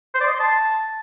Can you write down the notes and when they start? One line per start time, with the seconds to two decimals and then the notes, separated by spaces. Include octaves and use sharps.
0.14 C5
0.21 D5
0.27 D#5
0.34 C6
0.40 A5